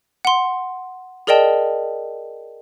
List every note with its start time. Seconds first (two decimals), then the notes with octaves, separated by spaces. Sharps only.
0.25 F#5 C6
1.27 G#4 A#4 D5 D#5 G5 A5